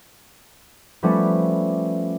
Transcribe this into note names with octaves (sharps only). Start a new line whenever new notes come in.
F3 G3 A3 B3 C#4